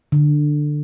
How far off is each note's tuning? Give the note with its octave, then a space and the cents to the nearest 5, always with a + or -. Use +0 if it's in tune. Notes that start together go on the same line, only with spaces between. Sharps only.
D3 +15